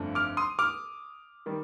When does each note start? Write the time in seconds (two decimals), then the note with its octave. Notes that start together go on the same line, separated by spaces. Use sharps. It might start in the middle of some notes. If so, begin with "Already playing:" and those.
Already playing: G1 F2 D3 A3 D4
0.15 D6 F6
0.37 C6 D#6
0.59 D6 F6
1.46 D#3 G3